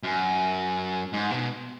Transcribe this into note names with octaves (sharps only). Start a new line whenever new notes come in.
F#2
G#2
B2